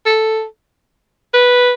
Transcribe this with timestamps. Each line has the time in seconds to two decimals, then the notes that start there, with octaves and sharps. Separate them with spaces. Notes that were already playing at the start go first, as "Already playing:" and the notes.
0.06 A4
1.34 B4